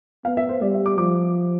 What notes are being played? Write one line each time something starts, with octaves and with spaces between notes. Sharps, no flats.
B3 F5
E5
C5
G3 D5
E5
D6
F3 D6